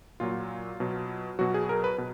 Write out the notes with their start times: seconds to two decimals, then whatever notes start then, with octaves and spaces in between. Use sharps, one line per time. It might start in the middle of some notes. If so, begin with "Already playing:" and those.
0.20 A#2 F#3 F4
0.80 B2 F#3
1.39 B2 F#3 F#4
1.54 G#4
1.69 A#4
1.84 B4
1.98 B2